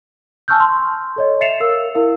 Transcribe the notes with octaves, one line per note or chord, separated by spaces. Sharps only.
G#5 A5 C#6 E6 F6 G6
C6
A4 C#5 D#5
E5 A6 C7 C#7 E7 F7
A#4 F5 E6
E4 A#4 F5